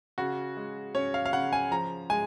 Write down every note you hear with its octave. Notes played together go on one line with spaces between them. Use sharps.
C#3 F#4
G#3
C#4 C#5
F5
F5
C#3 F#5
G#5
F3 A#5
G#3 G#5